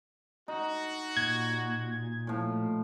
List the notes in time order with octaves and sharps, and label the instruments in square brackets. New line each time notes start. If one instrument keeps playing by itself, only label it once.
[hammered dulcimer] D#4 [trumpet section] F#4
[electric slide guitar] A#2 [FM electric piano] G#6
[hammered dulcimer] A2 F3